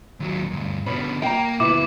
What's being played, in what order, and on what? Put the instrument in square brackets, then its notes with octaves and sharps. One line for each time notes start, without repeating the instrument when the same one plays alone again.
[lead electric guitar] D#2 F#3
D2 G2
[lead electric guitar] B2 D3 [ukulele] C#4 B4
[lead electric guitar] A#3 [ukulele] G5 A#5
[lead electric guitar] D2 B2 [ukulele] E4 B4 [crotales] D6